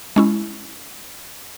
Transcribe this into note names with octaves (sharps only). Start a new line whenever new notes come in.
G#3 C#4 E4